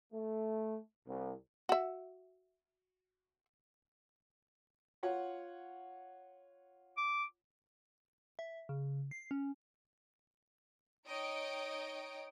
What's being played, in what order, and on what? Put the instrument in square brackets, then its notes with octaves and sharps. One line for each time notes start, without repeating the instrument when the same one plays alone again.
[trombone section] A3
C2
[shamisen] F#4 E5
[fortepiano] F4 C#5 F#5
[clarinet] D6
[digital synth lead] E5
C#3
C7
C#4
[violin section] D#4 C#5 D#5 G5 D7